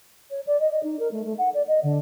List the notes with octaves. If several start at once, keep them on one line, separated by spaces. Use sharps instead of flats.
C#5
D5
D#5
D#5
D#4
A#4
A3
A3
F#5
D5
D#5
D3